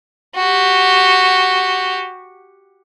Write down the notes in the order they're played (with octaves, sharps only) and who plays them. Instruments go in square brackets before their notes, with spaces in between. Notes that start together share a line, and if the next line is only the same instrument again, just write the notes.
[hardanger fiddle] F#4 G4